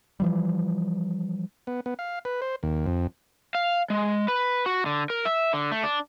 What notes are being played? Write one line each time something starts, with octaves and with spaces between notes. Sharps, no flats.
E3 F3 G3
B3
B3
F5
B4
C5
D#2
F2
F5
G#3
B4
F#4
D3
A#4
E5
D3
A3
D4